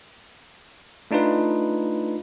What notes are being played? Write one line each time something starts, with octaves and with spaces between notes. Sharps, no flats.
A3 D4 D#4 F4 B4